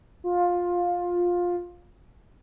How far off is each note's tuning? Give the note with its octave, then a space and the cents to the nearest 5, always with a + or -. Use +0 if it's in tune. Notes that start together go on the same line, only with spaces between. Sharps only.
F4 +15